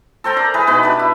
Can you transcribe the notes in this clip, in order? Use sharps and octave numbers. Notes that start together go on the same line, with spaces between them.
A4 C5 G5 A#5
A#4 D5 A#5
E3 G#4 B4
B2 D#4 B4
D4 G4 B4
E4